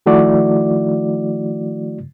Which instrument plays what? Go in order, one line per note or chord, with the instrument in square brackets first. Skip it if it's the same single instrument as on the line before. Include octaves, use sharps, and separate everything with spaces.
[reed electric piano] D#3 F3 A3 E4 F#4 D5